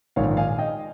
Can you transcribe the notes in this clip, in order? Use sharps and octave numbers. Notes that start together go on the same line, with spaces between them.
A#1 G#2 D#3 C#5 F5
F5 G#5
D#5 G5